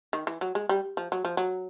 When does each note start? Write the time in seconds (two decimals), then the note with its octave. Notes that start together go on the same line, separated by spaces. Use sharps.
0.13 D#3
0.27 E3
0.41 F#3
0.55 G#3
0.69 G3
0.97 F3
1.12 F#3
1.25 F3
1.37 F#3